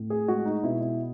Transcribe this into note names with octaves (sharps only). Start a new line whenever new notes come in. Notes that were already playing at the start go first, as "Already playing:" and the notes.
Already playing: A2
G#4
G#3 F#4
D#4
B2 E4
E4